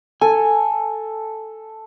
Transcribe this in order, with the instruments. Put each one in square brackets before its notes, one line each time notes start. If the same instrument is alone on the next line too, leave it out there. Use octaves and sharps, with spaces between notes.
[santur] A4 [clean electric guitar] G#5